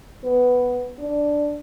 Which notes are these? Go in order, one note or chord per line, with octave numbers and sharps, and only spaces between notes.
B3
D4